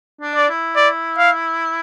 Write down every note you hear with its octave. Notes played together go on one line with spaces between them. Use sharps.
D4
D5
E4
D5
F5